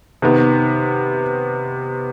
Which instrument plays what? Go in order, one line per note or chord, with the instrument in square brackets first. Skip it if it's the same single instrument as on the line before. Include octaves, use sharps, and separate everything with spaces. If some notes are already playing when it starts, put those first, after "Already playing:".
[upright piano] C3 D#3 B3